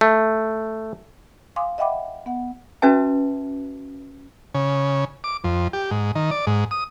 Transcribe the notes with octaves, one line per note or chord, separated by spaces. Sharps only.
A3
F5 G#5 C6 D6 D#6
D#5 E5 F#5 G5 B5 D6
B3 F#5
C#4 F#4 B4 E5 A5
C#3
D6
F2
G4
G#2
D#3
D5
G#2
D#6